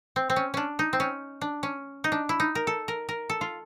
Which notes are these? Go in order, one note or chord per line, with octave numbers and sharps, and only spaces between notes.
C4
C4
C#4
C#4 D4
D#4
C4
C#4
D4
C#4
D#4
D4
E4
D#4
A#4
A4
A#4
A#4
A4
F4